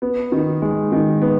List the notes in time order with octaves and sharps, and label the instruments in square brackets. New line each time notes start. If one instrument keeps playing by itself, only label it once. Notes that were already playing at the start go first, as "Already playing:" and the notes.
[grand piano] B3
D#3
G#3
D#3
B3